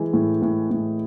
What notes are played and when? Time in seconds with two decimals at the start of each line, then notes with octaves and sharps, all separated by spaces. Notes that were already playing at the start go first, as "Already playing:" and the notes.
Already playing: E3 G#3
0.13 A2
0.42 A2
0.71 A2